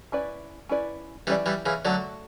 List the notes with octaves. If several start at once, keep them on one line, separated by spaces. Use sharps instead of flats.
C#4 E4 B4 D5
C#4 E4 B4 D5
E3 G3 C#4 E4 B4 D5
E3 G3
C#3 E3
D3 F#3 A3 C#4 F#4 A4 D5